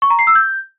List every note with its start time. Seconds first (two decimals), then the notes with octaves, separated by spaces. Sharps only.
0.02 C#6
0.10 A#5
0.19 C7
0.27 E6
0.35 G6